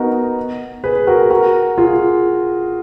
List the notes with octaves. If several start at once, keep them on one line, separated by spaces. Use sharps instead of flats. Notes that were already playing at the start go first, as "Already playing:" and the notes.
Already playing: B3 D#4 F#4 A#4
G#4 B4
F#4 A#4
F#4 A#4
F4 G#4